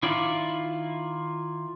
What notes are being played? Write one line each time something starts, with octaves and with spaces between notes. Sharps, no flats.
D#3 E4 F4 D5